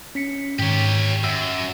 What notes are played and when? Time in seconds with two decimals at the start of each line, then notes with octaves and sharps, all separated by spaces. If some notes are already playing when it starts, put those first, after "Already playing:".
0.15 C#4 B6 C#7
0.59 G#2 D#3 G4 C#5
1.24 F#2 E6